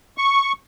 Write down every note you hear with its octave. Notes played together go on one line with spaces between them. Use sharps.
C#6